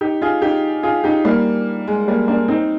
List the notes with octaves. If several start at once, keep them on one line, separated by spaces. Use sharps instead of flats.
D#4 G4
F4 G#4
D#4 G4
F4 G#4
D#4 G4
G3 A#3
G#3
G3 A#3
A#3 D4
C4 D#4